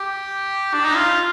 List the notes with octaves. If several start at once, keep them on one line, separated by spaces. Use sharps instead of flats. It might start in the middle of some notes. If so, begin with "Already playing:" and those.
Already playing: G4
D4
D#4
F4